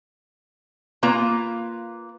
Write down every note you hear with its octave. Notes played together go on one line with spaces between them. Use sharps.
A#3 F4 B4 A#5